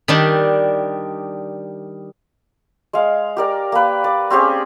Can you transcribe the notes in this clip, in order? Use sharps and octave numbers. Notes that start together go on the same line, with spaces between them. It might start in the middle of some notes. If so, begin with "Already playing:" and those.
D#3 G3 D4
G#3 F5
G4 A#4 D5
A#3 B4
D5
C4 C#4 G4 G#4